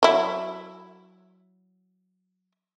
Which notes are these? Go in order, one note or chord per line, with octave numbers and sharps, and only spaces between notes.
F#3 E4